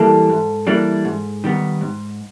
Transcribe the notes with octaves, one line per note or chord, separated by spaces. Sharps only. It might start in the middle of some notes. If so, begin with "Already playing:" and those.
Already playing: E3 G3 A#3 D4 A4
G#2
E3 G3 A#3 D4
G#2
D#3 G3 B3
G#2